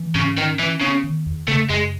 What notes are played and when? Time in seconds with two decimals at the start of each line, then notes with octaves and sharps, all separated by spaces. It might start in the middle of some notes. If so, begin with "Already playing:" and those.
Already playing: E3
0.15 G#2 C#3
0.37 D#3 C#4
0.59 E3 C#4
0.81 C#3 B3
1.04 D#3
1.26 E2
1.48 C#3 A3
1.70 F#2 G#3